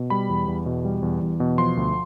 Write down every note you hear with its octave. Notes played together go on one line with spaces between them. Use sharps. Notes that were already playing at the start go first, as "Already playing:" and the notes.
Already playing: B2
G3 B5
E2
E2
B2
G3
E2
E2
B2
F3 C6
D2